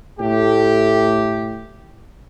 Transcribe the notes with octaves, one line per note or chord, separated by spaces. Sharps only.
A2 A3 G4